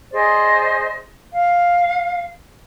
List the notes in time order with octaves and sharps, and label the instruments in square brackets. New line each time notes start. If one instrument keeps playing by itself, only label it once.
[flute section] G#4 C5 D5 D#5
F5